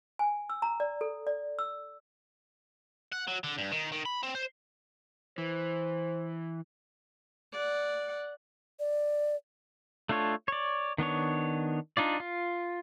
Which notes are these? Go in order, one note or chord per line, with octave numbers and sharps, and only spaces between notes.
G#5
E6
A#5
D5
A4
D5
E6
F#5
F#3
D3
G2
D#3
D#3
B5
C4
C5
E3 C5
D5 F#5
D5
A3 D4 F4 A4 C#5
C#5 D5
D#3 B3 D4 C#5
D4 D#4 F4 D5
F4